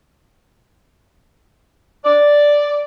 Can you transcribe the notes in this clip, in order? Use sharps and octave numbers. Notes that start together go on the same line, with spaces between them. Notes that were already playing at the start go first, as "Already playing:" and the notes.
D5